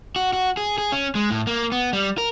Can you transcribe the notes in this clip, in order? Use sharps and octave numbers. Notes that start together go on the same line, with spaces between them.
F#4
F#4
G#4
G#4
C#4
G#3
A2
A#3
B3
G3
A#4